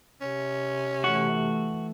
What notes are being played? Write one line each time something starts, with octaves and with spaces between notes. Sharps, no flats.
C3 C#4
E3 A3 F#4